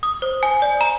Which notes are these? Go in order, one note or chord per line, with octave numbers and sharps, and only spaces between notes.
D#6
C5
G#5
D5
A#5